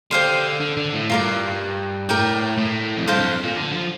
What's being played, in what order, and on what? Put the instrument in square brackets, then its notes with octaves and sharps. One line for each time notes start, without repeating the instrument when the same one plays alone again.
[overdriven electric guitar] D3 [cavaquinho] G4 C5 F5 C6
[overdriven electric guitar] D3
D3
A2
[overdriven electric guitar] G2 [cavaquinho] F4 A#4 D5
[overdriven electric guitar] A2 [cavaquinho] A#4 D5 G5
[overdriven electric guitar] A2
F2
[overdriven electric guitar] G2 [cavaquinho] A4 C5 F5 A5
[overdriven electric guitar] F2
A#2
D3
F3